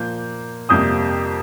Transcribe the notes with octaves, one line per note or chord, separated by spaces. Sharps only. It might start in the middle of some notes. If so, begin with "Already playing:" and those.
Already playing: A#2 F3 A#3 G6
F2 C3 G3 A#3 D#6 G6